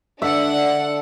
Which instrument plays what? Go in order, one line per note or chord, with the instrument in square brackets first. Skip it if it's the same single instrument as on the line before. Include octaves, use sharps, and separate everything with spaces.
[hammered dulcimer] D3 E5 [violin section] D4 F#5